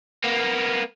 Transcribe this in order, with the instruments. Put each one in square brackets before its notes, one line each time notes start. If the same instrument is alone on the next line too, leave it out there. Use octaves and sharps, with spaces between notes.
[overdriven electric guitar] A#3 B3